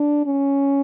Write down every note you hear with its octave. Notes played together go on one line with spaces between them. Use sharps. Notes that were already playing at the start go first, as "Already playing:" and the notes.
Already playing: D4
C#4